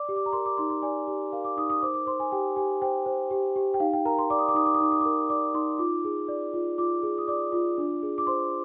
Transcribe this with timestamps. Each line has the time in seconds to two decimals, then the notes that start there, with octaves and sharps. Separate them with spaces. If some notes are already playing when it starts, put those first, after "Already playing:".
Already playing: D5 D6
0.09 G4
0.16 D6
0.26 A#5
0.33 A#4 C6
0.46 D6
0.58 D#4 C6
0.70 C6
0.82 D5 G#5
1.07 G4
1.33 A#4 F5
1.45 D6
1.57 D#4 D#6
1.70 D#6
1.82 C5 D6
1.94 D6
2.06 C5 C6
2.20 G#5
2.32 G4 G5
2.56 G4 G#5
2.82 C5 G5
3.06 C5
3.31 G4
3.56 G4
3.74 G5
3.80 D#4 F5
3.93 G5
4.05 A#4 A#5
4.18 C6
4.30 D5 D6
4.39 D#6
4.48 D6
4.54 D#4 D#6
4.66 D6
4.74 D#6
4.80 D#4 D6
4.92 D#6
5.01 A#4 D6
5.30 D5 D6
5.54 D#4 C6
5.79 F4 D6
6.05 G#4
6.28 D5
6.54 F4
6.78 F4 D6
7.03 G#4
7.18 D#6
7.28 D5 D6
7.52 F4
7.78 D4
8.03 G#4
8.18 D6
8.27 C5 C6